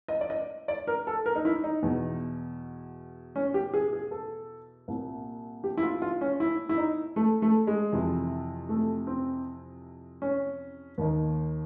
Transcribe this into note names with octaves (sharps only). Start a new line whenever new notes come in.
D#5
D5
D#5
D5
A#4
A4
A#4
D#4
E4
D#4
E2 B2
C#4
G4
G#4
G#4
A4
C2 A#2
G4
E4
F4
F4
C#4
E4
E4
D#4
A3
A3
G#3
F2 C3 E3
A3
C4
C#4
D#2 D#3